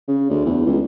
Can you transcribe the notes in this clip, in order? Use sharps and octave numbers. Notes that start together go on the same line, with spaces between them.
C#3
D2
E2
C#2